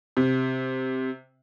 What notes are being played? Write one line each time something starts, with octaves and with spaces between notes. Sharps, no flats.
C3